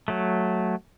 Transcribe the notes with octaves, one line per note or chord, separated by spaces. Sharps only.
F#3 A3